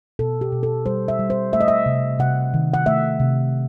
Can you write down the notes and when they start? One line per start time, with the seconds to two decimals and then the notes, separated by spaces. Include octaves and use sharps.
0.19 B2 A4
0.41 G4
0.52 B2
0.63 A4
0.86 G3 C5
1.08 E5
1.19 G3
1.30 C5
1.53 A3 E5
1.61 D#5
1.68 E5
1.86 C3
2.19 C3 F#5
2.54 D#3
2.74 F#5
2.86 A3 E5
3.20 C3